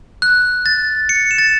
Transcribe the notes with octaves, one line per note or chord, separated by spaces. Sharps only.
F#6
A6
C#7
E7
A6